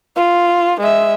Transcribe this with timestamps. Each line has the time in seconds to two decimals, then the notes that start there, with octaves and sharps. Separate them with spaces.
0.16 F4
0.80 G#3 E5